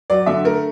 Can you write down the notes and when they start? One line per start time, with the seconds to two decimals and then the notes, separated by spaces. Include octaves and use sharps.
0.10 F#3 D5
0.26 D3 E5
0.44 A3 A#4